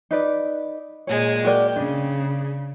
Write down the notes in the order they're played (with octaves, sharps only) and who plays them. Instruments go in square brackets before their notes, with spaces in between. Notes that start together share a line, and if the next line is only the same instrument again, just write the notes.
[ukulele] D#4 B4 D5
[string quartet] A#2 G#3 G#5 [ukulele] C#5
[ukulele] F#4 A#4 D5 [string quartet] G5
[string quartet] C#3 [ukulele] D4